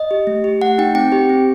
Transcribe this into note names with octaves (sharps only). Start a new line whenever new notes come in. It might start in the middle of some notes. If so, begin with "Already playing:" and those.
Already playing: D#5
G4
A3
G4
A3 F#5
D#4 G5
C4 G5
G4
C4